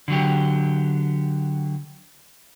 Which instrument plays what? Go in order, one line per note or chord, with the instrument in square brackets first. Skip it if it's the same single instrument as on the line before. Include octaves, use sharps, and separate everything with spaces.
[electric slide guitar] D3 F#3 G4